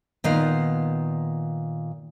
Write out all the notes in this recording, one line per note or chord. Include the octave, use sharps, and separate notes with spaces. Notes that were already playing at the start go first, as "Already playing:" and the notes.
A#2 D#3 B3 F5